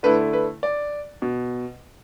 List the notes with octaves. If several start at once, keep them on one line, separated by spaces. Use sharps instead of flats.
D3 A3 E4 B4
B4
D5
B2